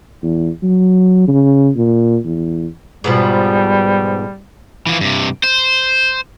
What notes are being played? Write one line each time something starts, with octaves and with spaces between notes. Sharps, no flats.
E2
F#3
C#3
A#2
E2
G#2 B2 F3 G3
E3 F3
G2 C3
C5